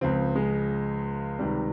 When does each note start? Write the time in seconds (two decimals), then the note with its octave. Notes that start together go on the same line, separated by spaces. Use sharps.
0.01 C#2 C#3 F3 C4
0.36 G#3
1.39 C#2 C3 D#3 G3